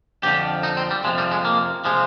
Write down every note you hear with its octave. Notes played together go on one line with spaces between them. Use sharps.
F2 D3 F3 G4
D#4
C4
G3
F2 C3 F3 G#3
G3
G#3
A#3
C3 F3 G#3